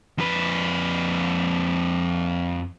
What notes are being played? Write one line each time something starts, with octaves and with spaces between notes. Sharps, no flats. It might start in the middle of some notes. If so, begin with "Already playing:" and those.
F2 B4